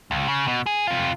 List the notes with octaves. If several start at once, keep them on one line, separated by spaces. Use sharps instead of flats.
C#2
C#3
B2
G#4
C3 F4